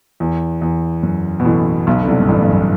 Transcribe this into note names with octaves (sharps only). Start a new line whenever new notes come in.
E2
E2
F#2
B2
A1 A2
B1 B2
D3
C2 C3
G2
A1 A2
G2
F#2